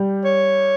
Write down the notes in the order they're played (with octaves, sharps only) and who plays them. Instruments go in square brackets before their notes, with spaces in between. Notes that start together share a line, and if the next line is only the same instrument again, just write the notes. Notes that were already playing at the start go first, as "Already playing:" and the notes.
Already playing: [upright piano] G3
[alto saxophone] C#5